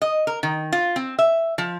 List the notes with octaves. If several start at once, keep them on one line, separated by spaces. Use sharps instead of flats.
D#5
A#4
D#3
F4
C4
E5
F3